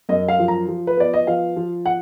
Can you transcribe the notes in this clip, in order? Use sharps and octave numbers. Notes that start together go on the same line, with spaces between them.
F#2 D#5
F5
F3
A#5
F3
B4
B3 D5
D#5
F3 F5
F3
F#5